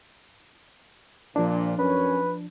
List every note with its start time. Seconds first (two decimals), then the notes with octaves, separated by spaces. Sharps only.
1.36 A#1 A#2 F3 D4
1.79 F#2 C#4 B4